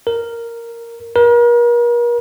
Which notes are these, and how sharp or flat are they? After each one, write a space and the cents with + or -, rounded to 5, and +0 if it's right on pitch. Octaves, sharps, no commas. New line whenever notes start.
A#4 -5
A#4 +40